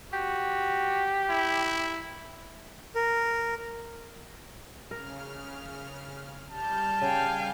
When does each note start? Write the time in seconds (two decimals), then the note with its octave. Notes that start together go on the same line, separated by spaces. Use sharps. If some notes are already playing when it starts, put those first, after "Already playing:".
0.13 F#4 G4
1.30 E4
2.95 A#4
4.91 C#3 A#4 F6
6.49 G3 A5 F6 G6
7.01 C#3 F5 G5 G#5